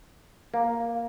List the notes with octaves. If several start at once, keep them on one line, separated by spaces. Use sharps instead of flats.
A#3